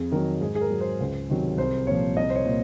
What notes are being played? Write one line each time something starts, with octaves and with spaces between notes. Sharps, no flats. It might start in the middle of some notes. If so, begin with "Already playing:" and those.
Already playing: F2 G#4
D#3 F#3 A#4
G#2 G#4
G#4
A#4
F#3
C5
C#2
C3 D#3 F#3
C2 C5
A#2 F3 C#5
C2 D#5
C5
C#5
A#2